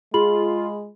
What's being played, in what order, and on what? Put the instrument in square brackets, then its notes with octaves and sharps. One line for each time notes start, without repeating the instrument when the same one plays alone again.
[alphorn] G#3 [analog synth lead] F4 [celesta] G#4 B5 F#7